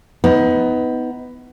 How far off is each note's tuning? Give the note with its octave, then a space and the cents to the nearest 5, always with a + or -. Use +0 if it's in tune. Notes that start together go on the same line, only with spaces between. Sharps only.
B3 +15 D#4 +30